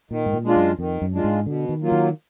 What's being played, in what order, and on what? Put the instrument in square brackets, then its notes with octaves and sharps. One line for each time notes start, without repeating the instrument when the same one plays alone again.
[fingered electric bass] A#2 [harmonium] D#3
[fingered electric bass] G#2
A#2
[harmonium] G#3 D4 F4
[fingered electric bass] F#2
[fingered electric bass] F2 [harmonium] D#3
[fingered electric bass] F#2
[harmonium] G#3 D4 F4
[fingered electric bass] G#2
[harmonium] B2 [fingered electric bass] D3
[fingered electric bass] D#3
[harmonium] F#3 A#3 F4
[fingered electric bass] D#3